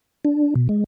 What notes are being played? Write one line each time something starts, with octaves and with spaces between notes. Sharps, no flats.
D4
B2
G#3